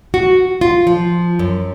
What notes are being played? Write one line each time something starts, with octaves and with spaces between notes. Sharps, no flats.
F#4
F4
F3
F#2